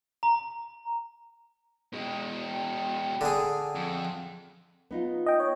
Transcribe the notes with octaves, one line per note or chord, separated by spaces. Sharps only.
A#5
B2 G#3 G5
D3 G#4
F2
B3 D#4 F4
D#5 G5
C#5